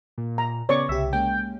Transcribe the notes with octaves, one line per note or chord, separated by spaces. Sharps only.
A#2
A#5
C#3 B3 C#5 D5 C#6
C2 C#3 G4 E5
G#3 A#3 C#4 G5